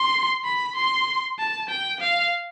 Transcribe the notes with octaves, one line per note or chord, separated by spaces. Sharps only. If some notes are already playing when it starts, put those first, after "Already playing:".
Already playing: C6
B5
C6
A5
G5
F5